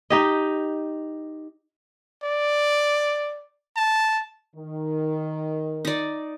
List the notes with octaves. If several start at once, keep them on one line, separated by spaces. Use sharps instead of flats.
D#4 G4 D#5
D5
A5
D#3
D#4 D5